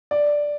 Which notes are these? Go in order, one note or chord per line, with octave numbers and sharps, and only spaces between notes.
D5